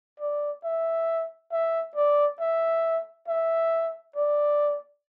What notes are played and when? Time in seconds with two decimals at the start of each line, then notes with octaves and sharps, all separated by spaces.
0.20 D5
0.64 E5
1.52 E5
1.96 D5
2.40 E5
3.28 E5
4.16 D5